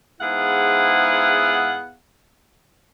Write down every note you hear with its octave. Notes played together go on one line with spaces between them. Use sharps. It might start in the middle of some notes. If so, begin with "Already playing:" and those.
G#2 B3 E4 G#4 F5 F#5